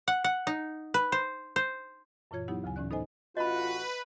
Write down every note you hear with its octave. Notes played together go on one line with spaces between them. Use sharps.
F#5
F#5
D#4
B4
C5
C5
F#2 A#2 E3 F4 C#5 G#6
F#3 B3 D#4 E4 G4 F#5
D2 C#3 F#3 G#5
A2 E3 C#4 D5 F#6
B3 D#4 A4 C5 D#5 G#5
A1 F4 F#4 B4 D#5 B5